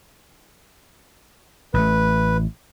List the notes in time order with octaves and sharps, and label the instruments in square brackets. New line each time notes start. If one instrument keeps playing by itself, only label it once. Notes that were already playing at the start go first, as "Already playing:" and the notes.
[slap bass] A1 A3 [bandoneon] B4